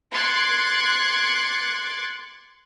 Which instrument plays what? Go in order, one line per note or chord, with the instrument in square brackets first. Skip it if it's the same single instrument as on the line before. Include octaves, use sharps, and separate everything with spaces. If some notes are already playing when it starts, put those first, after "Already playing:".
[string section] C6 D6 F#6 G#6 A6 C#7